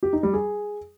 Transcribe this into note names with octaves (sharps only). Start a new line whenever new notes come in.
G4
D#4
G3
G#4